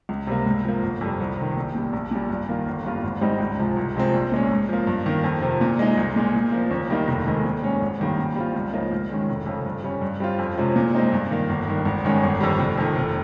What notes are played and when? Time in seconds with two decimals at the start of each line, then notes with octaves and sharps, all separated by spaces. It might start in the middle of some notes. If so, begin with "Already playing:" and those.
0.09 C#2
0.27 C3 G3 A#3
0.46 G#2
0.65 F3 A#3
0.83 G1
1.01 F2 C3 G3
1.20 C2
1.38 C3 D#3
1.57 A#1
1.75 A#2 G3
1.93 A#1
2.11 A#2 G3
2.30 G2
2.48 D#3 A#3 F4
2.66 G1
2.85 G2 G3 A#3 F4
3.04 G#1
3.21 G#2 G3 C4 D#4
3.40 C#2
3.58 C3 F3 G#3
3.77 C2
3.95 C3 F3 G#3 C4
4.14 A#1
4.32 A#2 G#3 C#4
4.51 G#2
4.69 F3 A#3
4.87 G2
5.06 D#3 A#3
5.24 F2
5.42 C3 F3
5.61 A#2
5.79 G#3 D#4
5.97 C2
6.16 A#2 G#3
6.34 A#2
6.52 F3 A#3
6.71 D#2
6.90 D#3 G3 A#3 D#4
7.08 F1
7.26 F2 D#3 G#3
7.44 A#2
7.63 G#3 C#4
7.82 G#1
8.00 G2 D#3 G3 A#3
8.18 A#2
8.36 G3 C4 F4
8.55 C#2
8.73 C#3 F3 A#3 D#4
8.91 G#2
9.10 D#3 G#3 C#4
9.29 F1
9.46 F2 C#3
9.66 G2
9.84 G3 C#4
10.01 G2
10.20 G3 C4 F4
10.39 F2
10.57 C3 F3 G#3 C#4
10.76 A#2
10.95 G#3 C4 D#4
11.12 G2
11.31 D#3 A#3
11.49 G1
11.67 G2 D#3
11.85 G#1
12.04 G2 D#3 G#3 C#4
12.23 G1
12.41 F2 D#3 G3
12.60 F1
12.78 F2 D#3
12.96 F1